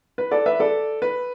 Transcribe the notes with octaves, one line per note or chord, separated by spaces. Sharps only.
B4
A4 D5
B4 E5
A4 D5
B4